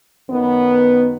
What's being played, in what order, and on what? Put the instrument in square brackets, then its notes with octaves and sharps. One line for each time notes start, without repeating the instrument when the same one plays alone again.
[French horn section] F#2 D#3 B3